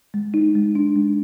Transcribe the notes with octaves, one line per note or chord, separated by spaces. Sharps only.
G#3
D#4
G#3
D4
G#3